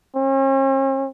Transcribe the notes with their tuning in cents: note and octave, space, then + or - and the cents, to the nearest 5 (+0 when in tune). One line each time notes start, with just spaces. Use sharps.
C#4 -45